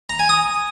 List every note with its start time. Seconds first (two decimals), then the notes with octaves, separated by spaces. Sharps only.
0.09 A#5
0.19 G#5
0.29 D#6